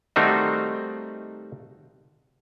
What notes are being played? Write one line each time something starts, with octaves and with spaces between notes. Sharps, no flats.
D#3 G3 A3 C4 D#4 F#4